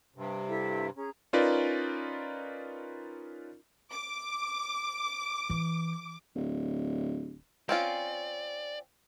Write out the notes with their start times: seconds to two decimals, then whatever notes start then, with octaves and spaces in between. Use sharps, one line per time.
0.16 G2 C3
0.49 E4 A4 F5
0.97 C#4 G#4 A#5
1.33 C#4 D#4 F4 A#4 B4 D5
3.91 D6
5.50 E3
6.35 D1
7.69 C4 C#4 F4 D5